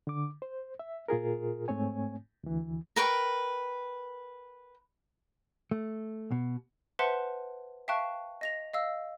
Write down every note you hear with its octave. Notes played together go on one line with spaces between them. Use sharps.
D3 D6
C5
E5
A#2 F4 G#4 A#4
G#2 A3 C4 C#5 G#5
D2 E3
A#4 B4 G5 C#6
A3
B2
B4 C5 E5 F#5 A5 C6
E5 F5 G5 A5 C#6 F#6
D#5 A#6 F7
D#5 F5 E6